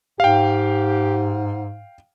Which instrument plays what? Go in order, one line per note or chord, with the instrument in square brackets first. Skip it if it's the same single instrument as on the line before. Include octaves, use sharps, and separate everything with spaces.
[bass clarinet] G#2 [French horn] G4 [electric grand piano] F5 G5